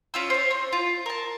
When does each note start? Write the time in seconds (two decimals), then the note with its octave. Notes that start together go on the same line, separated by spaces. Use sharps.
0.14 C#4 F4 E6
0.30 C5 C#5
0.51 C4
0.73 F4
1.06 A#4 A5